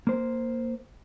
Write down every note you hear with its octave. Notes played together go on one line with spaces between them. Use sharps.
A#3 C5